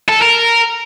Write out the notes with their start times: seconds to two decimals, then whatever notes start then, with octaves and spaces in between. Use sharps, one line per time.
0.09 A4
0.22 A#4